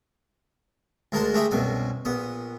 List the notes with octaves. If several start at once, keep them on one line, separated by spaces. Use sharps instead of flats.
D2 G#3 A#4 A5 C6
G#3 A3 G4 D#5 E5
C2 F#2 B2 G#5
A#1 B3 D#6